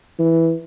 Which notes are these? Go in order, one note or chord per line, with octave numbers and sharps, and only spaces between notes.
E3